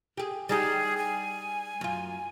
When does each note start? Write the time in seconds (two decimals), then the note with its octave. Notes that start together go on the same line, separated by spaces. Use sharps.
0.17 G4 G#4
0.49 G3 D#4 G4 G#4
0.97 G#5
1.81 F#2 F4